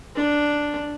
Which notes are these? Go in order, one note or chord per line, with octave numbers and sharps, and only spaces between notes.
D4